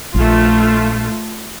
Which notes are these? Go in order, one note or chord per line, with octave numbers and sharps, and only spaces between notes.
A#1 A3 F4